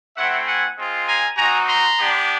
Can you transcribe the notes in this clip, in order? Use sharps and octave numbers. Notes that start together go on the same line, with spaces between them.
A3 C4 E4 E5 F#5
F#5 G#5
G#3 C4 F4
G#5 A#5
C4 D#4 F#4 G#5 A#5
A#5 C6
B3 D4 G4